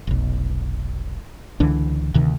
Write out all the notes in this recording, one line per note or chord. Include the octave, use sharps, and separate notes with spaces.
F1 B1
C#2 D3 E3 D4
D2 C3 D#3